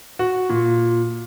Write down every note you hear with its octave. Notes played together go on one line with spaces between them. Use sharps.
F#4
A#2